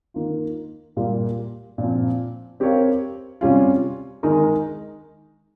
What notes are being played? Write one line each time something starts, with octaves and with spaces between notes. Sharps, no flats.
D#3 A#3 F4
A#2 G3 A#3 F4
A#2 F3 C4
C4 G4 A#4 C#5 F5
C3 G3 C#4 F4
D#3 G#3 D#4 A#4 D#5